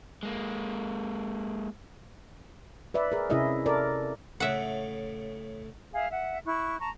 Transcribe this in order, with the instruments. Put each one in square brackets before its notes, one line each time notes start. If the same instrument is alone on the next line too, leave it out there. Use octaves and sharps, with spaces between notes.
[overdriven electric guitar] G#3 A#3
[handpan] B4 D5 E5
G#4 A#4
C3 C#4 E4 G#4 D#5 E5
A4 A#4 D5
[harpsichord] A2 C#3 A3 [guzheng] E5 F#5
[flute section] G#4 E5 F5
E5 F#5
E4 C#6 F#6
A5 A#5 C#6